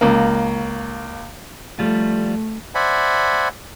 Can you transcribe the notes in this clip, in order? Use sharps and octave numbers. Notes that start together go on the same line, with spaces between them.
C#2 A#3
F3 G3 A3 F4
C5 D5 E5 F#5 G#5 B5